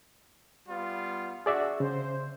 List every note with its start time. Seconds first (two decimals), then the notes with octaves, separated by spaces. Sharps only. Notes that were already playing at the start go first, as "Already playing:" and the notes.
0.68 G3 B3 F4
1.46 D4 F#4 G#4 D5 E5
1.80 C#3 C5